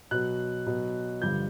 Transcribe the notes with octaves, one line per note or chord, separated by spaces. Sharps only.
B2 F#3 F#6
B2 F#3
G2 D3 F3 G6